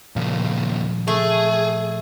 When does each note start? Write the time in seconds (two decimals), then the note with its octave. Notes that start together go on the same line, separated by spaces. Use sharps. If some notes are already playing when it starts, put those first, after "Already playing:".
0.16 D#2 A#2 C#3 F3
1.08 A3 G#4